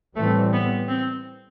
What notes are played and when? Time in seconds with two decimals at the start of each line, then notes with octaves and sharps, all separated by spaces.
0.16 A2 E3 G3 A3 C4
0.53 B3
0.88 C4